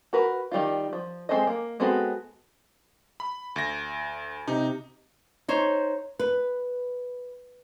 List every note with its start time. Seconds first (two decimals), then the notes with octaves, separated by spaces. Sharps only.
0.13 F#4 A#4 B4
0.52 D#3 G3 D#4 F4
0.93 F3
1.29 G#3 C4 A4 C5 D#5
1.47 A#3
1.80 G#3 B3 C4 F#4 A4
3.20 B5
3.56 D2 A#6
4.48 C3 D#4
5.48 D#4 C5 C#5
6.19 B4